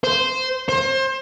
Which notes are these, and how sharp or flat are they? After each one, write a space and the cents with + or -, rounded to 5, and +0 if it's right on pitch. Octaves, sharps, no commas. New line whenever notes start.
C5 -10
C5 +30